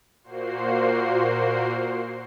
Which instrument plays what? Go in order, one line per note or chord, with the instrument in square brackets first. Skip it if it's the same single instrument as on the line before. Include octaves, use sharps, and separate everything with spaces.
[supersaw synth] A#2 A#3 F#4 C5 C7